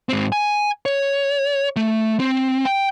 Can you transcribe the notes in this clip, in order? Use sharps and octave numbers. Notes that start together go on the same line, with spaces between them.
G#2 C4
G#5
C#5
A3
C4
G5